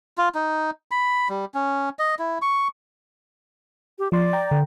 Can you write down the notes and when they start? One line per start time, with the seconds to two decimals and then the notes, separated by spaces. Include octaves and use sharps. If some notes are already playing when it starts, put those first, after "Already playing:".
0.18 F4
0.35 D#4
0.91 B5
1.29 G3
1.54 C#4
1.99 D#5
2.19 E4
2.42 C#6
3.99 G4
4.12 F3 D5 C6
4.33 G5 A#5
4.51 D3